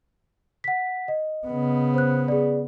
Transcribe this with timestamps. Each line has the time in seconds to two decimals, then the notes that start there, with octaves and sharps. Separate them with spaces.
0.64 F#5 B6
1.08 D#5
1.47 C#3 B3
1.94 C5 F#6
2.28 G#4 D5